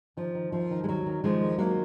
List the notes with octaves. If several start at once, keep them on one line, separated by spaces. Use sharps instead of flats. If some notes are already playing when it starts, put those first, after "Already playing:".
D#3 F3
D#3
D#2 F3
D#3
G#3
D#2 F#3
D#3
D#3 F3 G#3
D#2
D#3 F#3 A#3